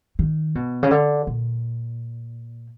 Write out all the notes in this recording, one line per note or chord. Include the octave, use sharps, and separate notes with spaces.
D#3
B2
C#3
D3
A#2